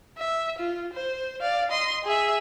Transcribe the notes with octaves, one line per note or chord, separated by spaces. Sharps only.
E5
F4
C5
D5 F5
D#5 C6
G#4 E5